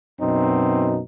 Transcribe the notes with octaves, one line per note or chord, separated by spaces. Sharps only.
F#2 B2 C4 D#4